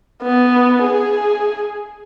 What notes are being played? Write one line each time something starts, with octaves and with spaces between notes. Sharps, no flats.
B3
G#4